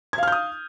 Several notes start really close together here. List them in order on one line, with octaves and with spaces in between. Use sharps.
G#6 F5 F6 G6 D#6